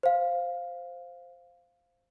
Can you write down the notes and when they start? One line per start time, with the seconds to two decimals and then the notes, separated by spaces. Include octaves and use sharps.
0.03 C5 F5